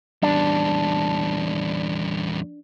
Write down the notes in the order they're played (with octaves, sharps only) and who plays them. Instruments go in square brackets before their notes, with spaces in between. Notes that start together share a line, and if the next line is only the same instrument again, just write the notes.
[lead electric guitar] E2 G3 [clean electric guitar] D4